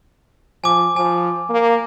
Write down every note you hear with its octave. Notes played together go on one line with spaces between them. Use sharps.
F3 G#5 D6
F3 G#5
A#3